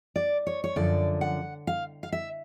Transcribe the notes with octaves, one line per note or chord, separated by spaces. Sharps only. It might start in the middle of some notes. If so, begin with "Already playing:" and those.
D5
C#5
C#5
F#2 D3 F3 D5
F#5
F5
F5
E5